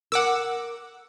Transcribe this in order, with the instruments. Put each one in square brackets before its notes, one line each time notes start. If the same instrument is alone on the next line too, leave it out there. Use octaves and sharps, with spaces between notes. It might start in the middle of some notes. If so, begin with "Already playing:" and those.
[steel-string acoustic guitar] A#4 [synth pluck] F#5 D6 E6